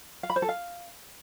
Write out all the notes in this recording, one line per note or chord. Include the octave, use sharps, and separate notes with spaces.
F5
B5
C5
A4
F5